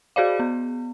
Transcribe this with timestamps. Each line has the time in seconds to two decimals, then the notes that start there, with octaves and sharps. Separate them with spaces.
0.16 F#4 G#4 C5 D5 F5
0.40 B3